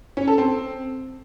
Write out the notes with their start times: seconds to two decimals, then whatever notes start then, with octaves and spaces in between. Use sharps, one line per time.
0.17 C#4
0.28 A4
0.38 C4